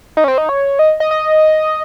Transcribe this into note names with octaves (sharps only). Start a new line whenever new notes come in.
D#4
C#4
C4
D#4
C#5
D#5
D#5
D#5